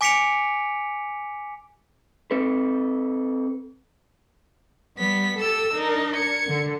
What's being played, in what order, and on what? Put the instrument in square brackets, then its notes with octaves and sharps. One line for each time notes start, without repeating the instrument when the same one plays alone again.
[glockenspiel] G#5 D6 B6 C#7 D7 F7
[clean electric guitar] C4 A4 B4
[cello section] G3 [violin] B3 B6
[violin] G4 E6 [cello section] A4
[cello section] D4 A#4 [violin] D#4
[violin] G#6 C#7
[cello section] D3